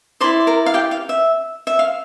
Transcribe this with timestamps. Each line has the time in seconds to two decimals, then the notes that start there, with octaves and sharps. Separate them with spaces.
0.20 E4 A#4 C5 D5 C6
0.47 A#4 A#5
0.66 F5
0.74 G4 G5
0.91 F5
1.09 E5
1.67 E5
1.79 F5